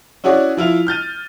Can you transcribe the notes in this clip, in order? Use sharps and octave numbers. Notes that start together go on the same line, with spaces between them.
C#4 E4 F#4 G#4 C#5 D5
F3 E4 F4 F7
F6 G6 A6 D#7